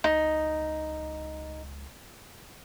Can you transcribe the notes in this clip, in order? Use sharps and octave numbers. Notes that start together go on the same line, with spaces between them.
C#2 D#4